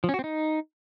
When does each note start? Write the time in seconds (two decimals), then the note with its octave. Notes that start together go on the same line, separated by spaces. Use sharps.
0.04 F3
0.09 C#4
0.14 F#4
0.19 C4
0.24 D#4